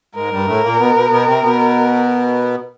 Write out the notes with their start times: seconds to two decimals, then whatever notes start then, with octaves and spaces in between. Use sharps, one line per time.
0.15 G#2 G#3 A#4
0.31 G2 G3
0.47 A2 A3
0.63 A#2 A#3
0.79 B2 B3
0.95 B2 B3
1.10 B2 B3
1.26 C3 C4
1.42 B2 B3